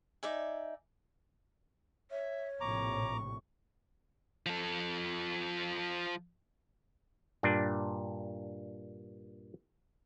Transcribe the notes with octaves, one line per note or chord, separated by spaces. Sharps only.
D#4 D5 E5 G#5
C#5 E5
A#1 A2 C3 A#5 C#6 D6
F3 A4
G2 A#2 D4